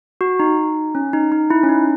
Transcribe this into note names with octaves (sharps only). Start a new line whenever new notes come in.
F#4
D#4
C#4
D#4
D#4
E4
C#4
D#4